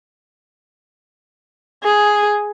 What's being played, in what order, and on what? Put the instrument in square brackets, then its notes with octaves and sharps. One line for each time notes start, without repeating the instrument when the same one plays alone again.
[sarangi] G#4